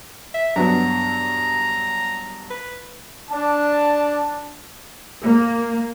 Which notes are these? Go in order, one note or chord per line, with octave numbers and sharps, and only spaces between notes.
E5
G2 F#3 B3 A#5
B4
D4 A5
A#3